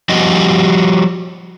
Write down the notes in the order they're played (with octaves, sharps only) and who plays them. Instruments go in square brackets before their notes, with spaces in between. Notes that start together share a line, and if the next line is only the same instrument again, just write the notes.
[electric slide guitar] F3 G3 F#4 D#5